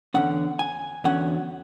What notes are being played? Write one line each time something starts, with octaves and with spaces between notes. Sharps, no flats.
E2 D3 F#3 C#4 F#5
G#5
E2 D3 F#3 C#4 F#5